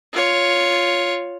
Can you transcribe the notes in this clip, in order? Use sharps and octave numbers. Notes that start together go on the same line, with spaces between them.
F4 C#5